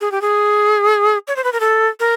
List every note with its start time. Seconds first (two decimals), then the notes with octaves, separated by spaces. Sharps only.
0.01 G#4
0.12 G4
0.21 G#4
1.28 C#5
1.36 C5
1.44 B4
1.53 A#4
1.60 A4
2.00 A#4